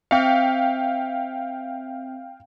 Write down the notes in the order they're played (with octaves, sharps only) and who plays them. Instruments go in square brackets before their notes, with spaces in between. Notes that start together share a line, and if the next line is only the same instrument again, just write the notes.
[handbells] C4 E5 C#7 [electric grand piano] F5 G5